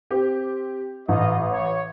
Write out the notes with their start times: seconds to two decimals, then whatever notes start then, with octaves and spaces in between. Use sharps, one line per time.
0.11 C4 G4
1.08 A1 F4 D#5
1.50 C#5